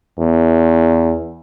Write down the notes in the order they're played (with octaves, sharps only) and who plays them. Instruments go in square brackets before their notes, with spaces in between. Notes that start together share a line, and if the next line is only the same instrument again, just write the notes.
[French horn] E2